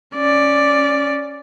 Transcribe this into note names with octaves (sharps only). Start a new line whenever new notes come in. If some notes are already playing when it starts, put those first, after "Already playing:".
C#4 D5